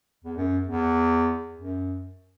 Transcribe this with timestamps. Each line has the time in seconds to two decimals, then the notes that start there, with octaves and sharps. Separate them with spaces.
0.24 E2
0.37 F#2
0.67 E2
1.56 F#2